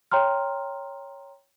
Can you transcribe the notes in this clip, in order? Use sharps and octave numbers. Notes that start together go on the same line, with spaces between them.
C#5 G5 A#5 C6 F6